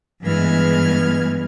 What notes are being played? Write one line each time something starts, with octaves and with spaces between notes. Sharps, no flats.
G2 E3 G#3 B3 F6 G#6